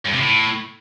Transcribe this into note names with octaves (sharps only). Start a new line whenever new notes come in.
G2
C3
A2